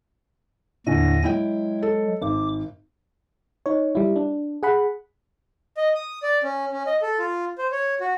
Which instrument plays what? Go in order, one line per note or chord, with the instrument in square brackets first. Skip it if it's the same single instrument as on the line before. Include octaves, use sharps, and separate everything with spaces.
[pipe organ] D#2 G#5 A#6 [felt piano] A2 D3
[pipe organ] F#3 G#3 [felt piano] E4 G5
[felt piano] A4
[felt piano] G#1 [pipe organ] D6
[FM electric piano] D#4 C#5
G3 E4
D4
G#4 F#5 B5
[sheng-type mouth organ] D#5
D#6
D5
C#4
C#4
D#5
A4
F4
C5
C#5
F#4